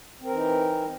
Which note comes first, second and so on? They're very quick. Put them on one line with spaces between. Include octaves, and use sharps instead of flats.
C4 A#4 E3 D#4